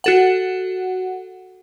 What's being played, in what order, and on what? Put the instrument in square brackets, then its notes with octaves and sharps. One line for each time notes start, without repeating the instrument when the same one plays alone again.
[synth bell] F#4 A4 F#5